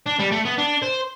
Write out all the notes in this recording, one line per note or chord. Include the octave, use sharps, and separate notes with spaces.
D4
G3
A3
B3
D4
C5